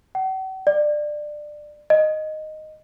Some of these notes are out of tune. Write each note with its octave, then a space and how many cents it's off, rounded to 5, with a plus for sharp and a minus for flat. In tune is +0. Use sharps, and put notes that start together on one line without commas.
F#5 +45
D5 +20
D#5 -5